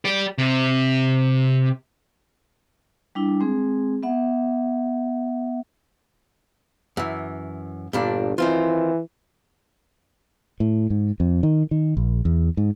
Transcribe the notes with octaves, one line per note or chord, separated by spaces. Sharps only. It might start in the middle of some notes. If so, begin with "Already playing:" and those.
G4 D5
C3
G3 D4 E4
G#3 C4 G#4
B3 E5 F#5
F#2 E3
G1 G2 A#2 D4
D#3 E3 C4 F4
A2
G#2
F2
D#3
D#3
A#1
E2
G#2